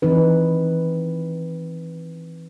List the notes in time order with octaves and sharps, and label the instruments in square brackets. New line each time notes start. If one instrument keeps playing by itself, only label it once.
[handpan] E3 C4 D#4 B4